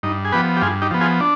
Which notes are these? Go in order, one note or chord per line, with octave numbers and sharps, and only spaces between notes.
G2 D#4
G#4
F3 B3 G4 B4
G4
G2 F4 G#4
D#4 G4
F3 B3
F4 G#4
D4